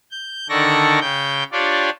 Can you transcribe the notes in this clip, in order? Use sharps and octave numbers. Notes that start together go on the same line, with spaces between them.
G6
D3 D#3 A4 D5 C#6 A#6
C#3 G5 G6
D4 F4 G4 C#5 D5